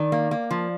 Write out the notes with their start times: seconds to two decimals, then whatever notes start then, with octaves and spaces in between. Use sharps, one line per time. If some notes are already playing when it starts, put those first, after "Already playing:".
Already playing: D#3 D5
0.12 A#3
0.31 A#3
0.51 F3